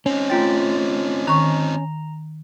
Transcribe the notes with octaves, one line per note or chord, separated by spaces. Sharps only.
C4 C#4 D#4
A3 F4 G5 A6
D#3 A#5 C#6